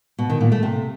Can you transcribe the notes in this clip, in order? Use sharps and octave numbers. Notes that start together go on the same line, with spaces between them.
B2
D#3
A#2
A3
C3